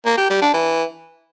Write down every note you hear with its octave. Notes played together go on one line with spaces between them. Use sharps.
A#3
G4
G3
D4
E3